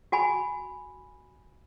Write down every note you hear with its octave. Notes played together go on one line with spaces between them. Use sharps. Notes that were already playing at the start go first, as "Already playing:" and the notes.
F#4 G#5 B5